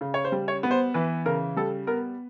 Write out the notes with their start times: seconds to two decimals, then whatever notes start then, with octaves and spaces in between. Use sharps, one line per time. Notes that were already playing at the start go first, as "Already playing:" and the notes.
0.01 C#3
0.14 C#5
0.25 C5
0.32 G3
0.48 C#5
0.63 B3
0.71 C5
0.94 E3 B4
1.26 C#3 A#4
1.56 G3 A4
1.87 B3 A#4